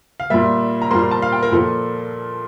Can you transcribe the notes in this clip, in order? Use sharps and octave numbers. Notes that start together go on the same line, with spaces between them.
F5
A#2 G3 A#3 E5
A#5
A#2 G3 A#3 C6
A5
F5
G5
A#4
A#2 F3 A#3 A4